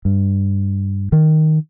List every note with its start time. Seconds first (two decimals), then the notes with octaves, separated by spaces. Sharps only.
0.05 G2
1.12 D#3